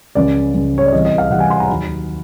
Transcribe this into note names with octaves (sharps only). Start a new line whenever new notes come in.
C#2 C#3 F3 D5
C#2 C#3 F3
C#5
D5
C2 C3 E3 G3 D#5
D#5
F5
C2 C3 E3 G3 F#5
G#5
C6
A#5
D#2 D#3 F#3 B5